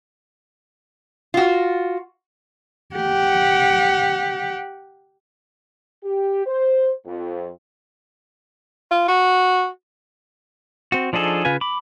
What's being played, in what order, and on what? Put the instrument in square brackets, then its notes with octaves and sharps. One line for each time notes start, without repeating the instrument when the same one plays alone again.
[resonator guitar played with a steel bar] F4 F#4
[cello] G4 F#5
[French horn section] G4
C5
F2
[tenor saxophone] F4
F#4
[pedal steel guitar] C4 F#4
F3 D4 D#4 G#4 A4
C#3 F4 B4 G#5
B5 D6